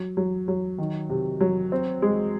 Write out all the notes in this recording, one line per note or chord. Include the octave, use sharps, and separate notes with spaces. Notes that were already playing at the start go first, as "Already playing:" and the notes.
Already playing: F#3
F#3
F#3
D#3
C3
F#3
C4
G#3